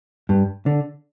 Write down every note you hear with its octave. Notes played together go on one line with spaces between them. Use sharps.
G2
D3